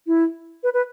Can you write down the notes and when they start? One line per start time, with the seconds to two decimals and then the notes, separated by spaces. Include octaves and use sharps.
0.07 E4
0.63 B4
0.74 B4